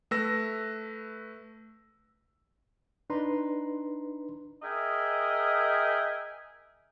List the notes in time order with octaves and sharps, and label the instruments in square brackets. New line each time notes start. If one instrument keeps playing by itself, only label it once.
[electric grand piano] A3 B4 E6 A#6
[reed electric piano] D4 D#4 B4 A#5 C6
[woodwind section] G#4 A#4 D#5 E5 G5 G#5